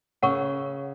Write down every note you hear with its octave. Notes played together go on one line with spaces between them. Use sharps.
C#3 A#4 C#5 F#5 C#6